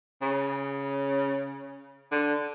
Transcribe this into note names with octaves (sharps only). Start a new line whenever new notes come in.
C#3
D3